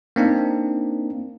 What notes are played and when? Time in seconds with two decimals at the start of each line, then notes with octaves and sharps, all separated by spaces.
0.16 A#3 C4 D4 D#4